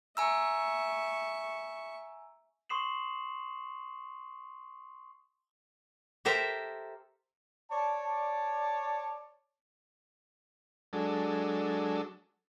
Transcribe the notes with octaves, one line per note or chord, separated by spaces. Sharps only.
E5 G#5 A#5 C#6 E6
C6 C#6 D#6 C7 E7 F#7
G4 A4 A#4 C5 E5 G5
C#5 D5 A5
F#3 G#3 D4 A4